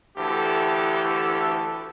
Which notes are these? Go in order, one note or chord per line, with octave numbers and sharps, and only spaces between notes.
D2 E3 G4 A4